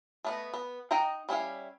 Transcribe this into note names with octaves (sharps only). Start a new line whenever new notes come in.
A3 B3 D#5
B3
D#4 D#5 F#5 G5 A#5
G3 C#4 E4 F5